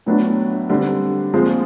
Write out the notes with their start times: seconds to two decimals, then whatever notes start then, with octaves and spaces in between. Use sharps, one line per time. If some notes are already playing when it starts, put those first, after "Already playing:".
0.06 A2 F#3 B3 D4
0.70 D3 G3 C4
1.33 A#2 F3 G#3 C4